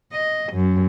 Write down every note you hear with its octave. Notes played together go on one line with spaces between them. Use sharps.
D#5
F#2